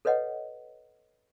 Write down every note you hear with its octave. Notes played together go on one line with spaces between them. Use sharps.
A4 B4 C#5 D#5 F#5